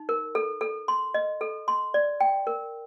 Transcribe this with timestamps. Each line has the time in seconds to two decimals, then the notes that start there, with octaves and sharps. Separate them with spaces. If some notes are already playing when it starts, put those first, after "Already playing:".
Already playing: D#4
0.09 A#4
0.35 A4
0.61 A4
0.88 C6
1.14 D#5
1.41 A4
1.68 C6
1.94 D5
2.20 G5
2.47 A#4